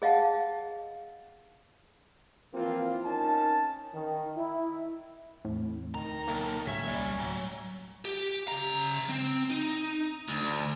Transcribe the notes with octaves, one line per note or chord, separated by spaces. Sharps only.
G#4 D#5 F5 F#5 A5
E3 F3 A#3 C4 F4
C#4 D#4 A#4 G#5 A5
D#3
E4
E2 A2 C4
D2 D#3 A#5
B1 A#3
D1 B1 A#3 C#4 E5
G3
A2 F#3 G3
G4
C#3 A#5
C4
D#4
D2